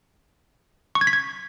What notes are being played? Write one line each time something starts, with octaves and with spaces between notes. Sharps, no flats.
C#6
G#6
B6
G#6